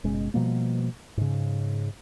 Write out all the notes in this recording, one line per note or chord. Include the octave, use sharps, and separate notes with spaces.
F#1 B2 G#3 C#4
B2 F3 G3 A#3
G#2 C#3